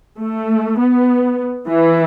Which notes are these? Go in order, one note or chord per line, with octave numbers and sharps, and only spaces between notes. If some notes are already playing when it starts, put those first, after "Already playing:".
A3
B3
E3 E4